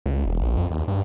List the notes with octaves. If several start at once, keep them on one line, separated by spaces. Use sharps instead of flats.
C#2
E1
A#1
F2
D#2
G2